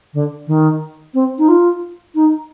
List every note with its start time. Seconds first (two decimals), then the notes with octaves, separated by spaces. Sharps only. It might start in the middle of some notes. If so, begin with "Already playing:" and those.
0.14 D3
0.47 D#3
1.14 C4
1.38 D#4
1.48 F4
2.15 D#4